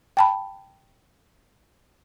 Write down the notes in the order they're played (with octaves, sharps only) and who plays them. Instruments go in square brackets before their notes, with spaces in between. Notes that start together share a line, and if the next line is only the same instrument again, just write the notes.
[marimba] G5 A5 B5